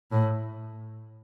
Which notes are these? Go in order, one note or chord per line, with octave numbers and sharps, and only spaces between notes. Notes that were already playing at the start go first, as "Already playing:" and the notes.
A2